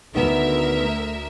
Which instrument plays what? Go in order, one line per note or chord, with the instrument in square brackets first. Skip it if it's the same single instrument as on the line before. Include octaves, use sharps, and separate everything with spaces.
[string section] D2 A#4 E5 [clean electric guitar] D#3 B3